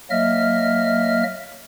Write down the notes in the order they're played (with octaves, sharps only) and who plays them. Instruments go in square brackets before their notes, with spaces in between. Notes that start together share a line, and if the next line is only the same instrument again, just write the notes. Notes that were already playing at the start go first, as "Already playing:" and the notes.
[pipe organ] F#3 A#3 D#5 E5 F6